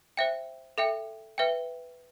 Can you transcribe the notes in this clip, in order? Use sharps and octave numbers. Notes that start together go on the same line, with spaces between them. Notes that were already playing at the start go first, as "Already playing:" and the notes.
C5 E5 G5
A4 E5 G5
B4 E5 G5